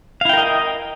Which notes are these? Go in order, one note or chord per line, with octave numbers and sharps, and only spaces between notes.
E4 A#4 D#5 F5 G5